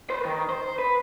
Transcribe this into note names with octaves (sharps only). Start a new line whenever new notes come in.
B4 C5
D#3
C5
B4